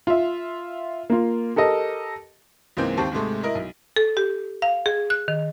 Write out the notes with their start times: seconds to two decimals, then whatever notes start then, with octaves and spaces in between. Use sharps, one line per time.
0.07 F4 E5
1.10 A#3 F4
1.56 G4 A4 A#4 D#5
2.77 C#2 G#2 E3 A#3 C4 G6
2.97 D#2 C4 G4 A5 C#6
3.12 G#2 C3 G#3 A3
3.43 E4 A#4 D#5
3.55 B1
3.96 A4
4.17 G4
4.62 F5
4.86 G#4
5.10 F#6
5.28 D#3